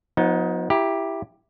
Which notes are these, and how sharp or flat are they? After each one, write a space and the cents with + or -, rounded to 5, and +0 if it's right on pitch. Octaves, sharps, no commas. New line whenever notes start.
F3 +45 B3 +0 D#4 +15
E4 +5 G4 +5 A#5 +30